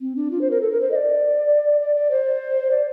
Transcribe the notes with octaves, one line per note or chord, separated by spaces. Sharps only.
C4
D4
F4
C5
A#4
A4
A#4
C5
D#5
D5
D5
D5
C5
D5